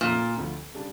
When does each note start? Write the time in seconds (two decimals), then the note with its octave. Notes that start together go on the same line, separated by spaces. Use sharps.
0.01 F1 F2 A#2 C#3 F3 A#3
0.37 D2 D3 F3
0.74 C#3 G3 D4